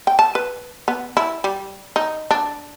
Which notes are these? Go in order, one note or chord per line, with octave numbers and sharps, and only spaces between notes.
G5
A5
B4
B3
E4
G3
D#4
D4